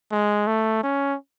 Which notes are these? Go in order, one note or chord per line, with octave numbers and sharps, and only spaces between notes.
G#3
A3
C#4